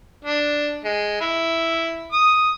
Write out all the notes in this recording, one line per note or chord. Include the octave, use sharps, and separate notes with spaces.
D4
G#3
E4
D#6